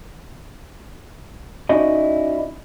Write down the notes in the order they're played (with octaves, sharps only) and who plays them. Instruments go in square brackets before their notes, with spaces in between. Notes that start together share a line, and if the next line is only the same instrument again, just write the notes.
[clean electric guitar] C#4 D#4 E4 F#4 D5 D#5